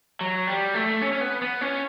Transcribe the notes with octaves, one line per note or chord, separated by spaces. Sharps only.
F#3
G3
A3
C#4
C#4
B3
B3
C#4